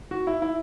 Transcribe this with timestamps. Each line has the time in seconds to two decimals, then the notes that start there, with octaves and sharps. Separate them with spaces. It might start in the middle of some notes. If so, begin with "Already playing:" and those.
0.11 F#4
0.27 E4
0.42 E4